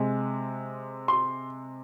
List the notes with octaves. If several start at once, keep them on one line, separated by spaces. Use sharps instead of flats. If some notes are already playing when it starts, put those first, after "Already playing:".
Already playing: C3 G#3
C6